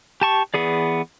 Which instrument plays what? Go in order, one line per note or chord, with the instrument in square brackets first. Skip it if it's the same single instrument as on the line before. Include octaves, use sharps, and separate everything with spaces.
[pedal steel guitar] G4 A5 C#6
E3 B3 G#4 D5